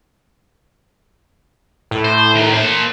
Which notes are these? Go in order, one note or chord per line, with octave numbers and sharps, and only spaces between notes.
A2
C5
D#2 A#4
A#3 C5